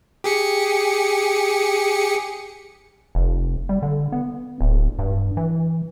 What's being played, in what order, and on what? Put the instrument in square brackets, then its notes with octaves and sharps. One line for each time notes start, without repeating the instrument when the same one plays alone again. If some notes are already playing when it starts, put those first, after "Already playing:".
[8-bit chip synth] G4 G#4 C#7
[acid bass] F1
G3
D3
B3
D1
G2
E3